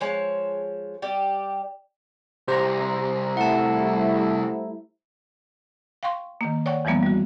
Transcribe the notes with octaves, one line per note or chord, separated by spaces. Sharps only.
F3 G#3 C#5 A5
G3 G4
C2 G4 C5 A#5
G3 A3 E4 F#5 A5
F5 G5 C6 C#6
D#3 A#3
C#5 D5 F#5 G5 C#6
E2 E3 F3 G3 A#3 B3
G3 F#4